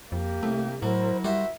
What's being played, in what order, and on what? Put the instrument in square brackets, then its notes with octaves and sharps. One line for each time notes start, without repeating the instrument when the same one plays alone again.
[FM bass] F2 [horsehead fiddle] A#3 G4
[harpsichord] C2 [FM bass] A3
[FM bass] A2 [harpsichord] F#3 [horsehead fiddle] E4 A#4 [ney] C5
[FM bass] G3 [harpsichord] F#4 C5 [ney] E5